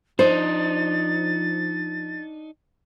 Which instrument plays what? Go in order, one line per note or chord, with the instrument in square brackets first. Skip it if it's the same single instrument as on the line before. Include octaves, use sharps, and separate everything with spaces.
[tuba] F3 [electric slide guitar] D4 D#4 [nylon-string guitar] C5 [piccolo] A6